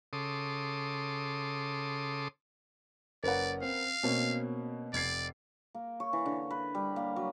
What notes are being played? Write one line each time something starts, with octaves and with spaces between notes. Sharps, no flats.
C#3 A4 C6 D6 D#6
F#1 A#4 B4 C#5 D5 F#5
C4 F5
B2 A#3 C4 C#4
F1 D5 G#6 C7
A#3
C#5
E3
D3
B4
G3
A#3
F#3